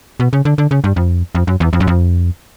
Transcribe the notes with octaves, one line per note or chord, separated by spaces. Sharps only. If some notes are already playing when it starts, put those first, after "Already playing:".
B2
C#3
D3
D3
C#3
G2
F2
F2
F#2
E2
F2
F#2
F2